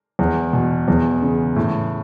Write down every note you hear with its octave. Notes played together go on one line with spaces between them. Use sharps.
E2
B2
E2
C#3
A2